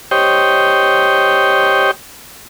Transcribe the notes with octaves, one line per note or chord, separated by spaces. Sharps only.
G4 C5 C#5 D#5 G5